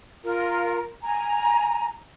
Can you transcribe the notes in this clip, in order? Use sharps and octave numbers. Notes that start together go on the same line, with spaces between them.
F4 A#4
G#5 A#5